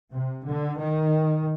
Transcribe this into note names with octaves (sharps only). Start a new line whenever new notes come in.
C3
D3
D#3